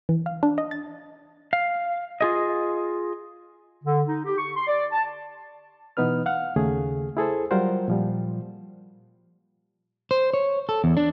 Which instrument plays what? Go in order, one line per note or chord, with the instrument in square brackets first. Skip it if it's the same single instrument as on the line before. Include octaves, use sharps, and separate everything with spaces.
[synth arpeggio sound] E3
F5
D4
D#5
A6
[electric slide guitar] F5
F4 G#4 D#5
[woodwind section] D3
D#4
G4
C#6
C6
D5
A5
[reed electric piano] B2 E3 B3 D#4 B4 F6
F5 F#5 F6
D#2 C#3 A3 G#4
E4 G#4 A4 C5
F#3 G3 F4 A#4 C5 F#5
A#2 F3 G3
[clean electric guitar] C5
C#5
A4
E2
D4